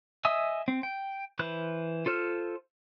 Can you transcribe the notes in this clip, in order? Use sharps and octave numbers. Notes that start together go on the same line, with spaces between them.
D#5 E5 G#5 D#6 E6
C4
G5
E3 B4 C5 F#6
F4 A4 C5 F6